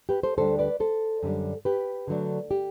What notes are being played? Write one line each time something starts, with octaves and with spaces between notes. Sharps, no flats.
G4 B4
A4 C5
D2 D3 G3 D4 A4 C5
B4 D5
A4 C5
F#2 D3 G3 D4
G4 B4
D3 F#3 A3 D4
G4